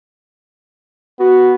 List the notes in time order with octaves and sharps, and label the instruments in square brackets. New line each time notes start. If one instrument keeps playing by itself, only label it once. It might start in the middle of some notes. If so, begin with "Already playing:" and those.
[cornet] B3 [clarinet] F#4